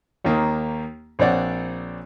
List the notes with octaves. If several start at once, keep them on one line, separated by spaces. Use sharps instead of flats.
D#2 D#3 A#3
A#1 C4 C#5 D5 F#5